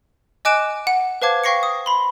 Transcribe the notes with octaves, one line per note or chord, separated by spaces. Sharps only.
D#5 G#5 D6 F#6 D7 E7
F#5
B4 C5 F5 A5 D6 G#6
F5 G5 C#6 A#6 C7 C#7
D#6
B5 C6